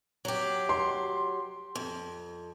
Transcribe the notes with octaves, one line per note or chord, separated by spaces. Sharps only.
F#3 G4
C6
F2